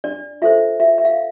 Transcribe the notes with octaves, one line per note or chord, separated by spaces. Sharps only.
D4 D5
F4 A4 C5 E5
F4 E5
E5
F5